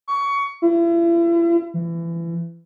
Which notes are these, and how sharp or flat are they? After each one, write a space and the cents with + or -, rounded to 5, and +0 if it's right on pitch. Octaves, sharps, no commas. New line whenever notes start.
C#6 +20
E4 +40
E3 +30